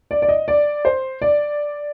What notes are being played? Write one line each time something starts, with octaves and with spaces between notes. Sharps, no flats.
D5
D5
D#5
D5
C5
D5